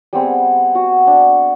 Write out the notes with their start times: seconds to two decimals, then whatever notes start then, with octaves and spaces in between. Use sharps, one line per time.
0.13 G3 B3 C4 G#4
0.75 F#4
1.07 D4